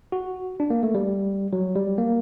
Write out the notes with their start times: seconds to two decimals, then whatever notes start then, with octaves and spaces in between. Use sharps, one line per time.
0.12 F#4
0.60 D4
0.70 A#3
0.83 A3
0.95 G3
1.53 F#3
1.75 G3
1.98 A#3